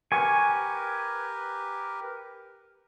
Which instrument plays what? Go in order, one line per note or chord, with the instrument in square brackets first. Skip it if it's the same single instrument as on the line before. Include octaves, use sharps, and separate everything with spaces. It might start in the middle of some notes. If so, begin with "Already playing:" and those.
[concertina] G4 A#4 B4 [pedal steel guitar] G#5 C#6